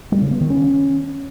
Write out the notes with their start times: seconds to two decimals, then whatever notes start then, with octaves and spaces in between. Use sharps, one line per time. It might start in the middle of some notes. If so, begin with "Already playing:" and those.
0.12 G3
0.21 C#3
0.31 B3
0.41 D#3
0.50 C#4